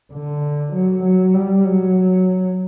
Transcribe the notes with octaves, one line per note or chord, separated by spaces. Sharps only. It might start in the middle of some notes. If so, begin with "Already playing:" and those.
D3
F#3
F#3
G3
F#3